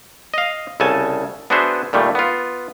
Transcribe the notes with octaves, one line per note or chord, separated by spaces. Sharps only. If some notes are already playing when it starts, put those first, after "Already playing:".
D#5 F5
C2 C#3 A4 G#5 A5
B3 D4 F#4 G#4 C5 E5
A#2 D#3 G3 A3
B3 F4